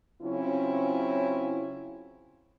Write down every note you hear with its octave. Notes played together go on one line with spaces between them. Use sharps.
C#3 F#3 C4 C#4 E4 F4